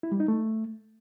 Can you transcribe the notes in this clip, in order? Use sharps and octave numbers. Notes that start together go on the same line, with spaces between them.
E4
G3
D#4
A3